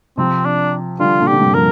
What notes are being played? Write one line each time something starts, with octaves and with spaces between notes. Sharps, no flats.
C3 F3 C4
D4
D3 G3 F4
A#2 D3
G4
D3
G2 C3
F3 A#4